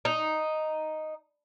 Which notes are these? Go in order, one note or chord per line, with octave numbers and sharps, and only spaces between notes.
D#4